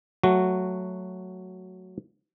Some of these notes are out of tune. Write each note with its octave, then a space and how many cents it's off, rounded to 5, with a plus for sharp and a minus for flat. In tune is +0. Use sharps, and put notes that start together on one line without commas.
F#3 +0 A3 +0 F#4 +0